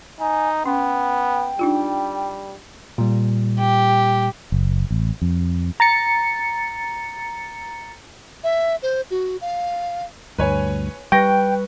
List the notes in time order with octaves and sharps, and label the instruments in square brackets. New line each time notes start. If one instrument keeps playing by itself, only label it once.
[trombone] D#4 [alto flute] G#5
[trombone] B3 [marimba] C#4 [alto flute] G5
[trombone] G3 [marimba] D4 D#4 F4
[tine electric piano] A#2 G3
[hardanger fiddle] G4
[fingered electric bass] F#1
A1
F2
[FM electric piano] A#5 A6 C#7
[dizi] E5
C5
F#4
F5
[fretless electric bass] D2 G2 [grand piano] B4 C#5 G#5
[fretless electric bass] G3 [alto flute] B4 [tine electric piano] G5 [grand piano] C#6 A#6